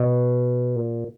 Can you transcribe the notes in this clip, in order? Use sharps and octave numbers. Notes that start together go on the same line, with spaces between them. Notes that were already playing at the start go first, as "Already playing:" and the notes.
Already playing: B2
A#2